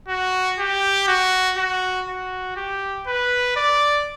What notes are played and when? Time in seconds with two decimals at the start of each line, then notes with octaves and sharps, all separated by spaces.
0.08 F#4
0.59 G4
1.07 F#4
1.57 F#4
2.08 F#4
2.56 G4
3.07 B4
3.56 D5